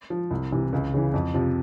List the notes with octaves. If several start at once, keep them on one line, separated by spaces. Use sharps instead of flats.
F3
C2
C3 E3
C#2
C#3 E3
F2
C3 F3